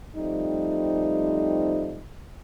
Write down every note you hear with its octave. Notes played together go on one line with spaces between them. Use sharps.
F3 G3 A3 C4 D#4